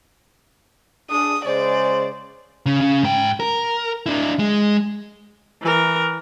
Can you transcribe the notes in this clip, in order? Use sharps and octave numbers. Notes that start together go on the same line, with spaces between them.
D4 G#4 D#6
C#3 G#3 C5 D5
C#3
C#3
G#2 G5
A#4
D4 E4
G#3
E3 A#4